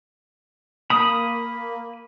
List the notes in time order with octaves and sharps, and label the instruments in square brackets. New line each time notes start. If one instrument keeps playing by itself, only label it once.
[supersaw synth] A#3 [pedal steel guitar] B5 D#6